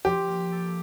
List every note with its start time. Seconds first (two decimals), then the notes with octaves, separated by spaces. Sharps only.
0.05 F3 G4
0.28 A#3
0.52 A4